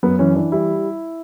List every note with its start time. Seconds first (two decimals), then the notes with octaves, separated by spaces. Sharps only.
0.03 F#2 B3
0.19 E3 C#4
0.36 E3 D4
0.52 G3 E4